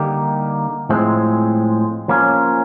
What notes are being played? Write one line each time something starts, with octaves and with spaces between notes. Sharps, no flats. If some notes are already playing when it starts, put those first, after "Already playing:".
Already playing: D3 G3 A#3 D#4 G4
A2 F3 G#3 C4
F3 A#3 C#4